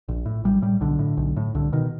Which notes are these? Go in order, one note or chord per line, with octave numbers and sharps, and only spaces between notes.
A#1
A2
A#1 G3
A2 G3
B1 D3
A2
B1
A2
C2 D3
B2 D#3